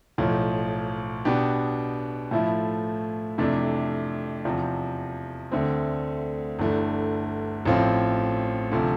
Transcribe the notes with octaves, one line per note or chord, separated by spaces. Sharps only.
B1 A2 F3
B2 B3 D4 G4
A2 F3 A3 E4
F2 C3 E3 A3 D4
E2 C3 F3
D2 D3 A3 C4
G1 G2 E3 A3
A1 A2 F3 C4 F4
D2 C3 F3